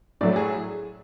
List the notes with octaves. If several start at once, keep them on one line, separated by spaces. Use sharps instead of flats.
A2 F#3 A3 D5
G#4